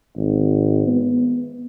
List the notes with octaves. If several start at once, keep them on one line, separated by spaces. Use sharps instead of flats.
G#1
B3